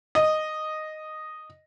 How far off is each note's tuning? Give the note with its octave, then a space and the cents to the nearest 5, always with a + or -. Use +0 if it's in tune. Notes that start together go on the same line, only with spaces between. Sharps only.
D#5 -5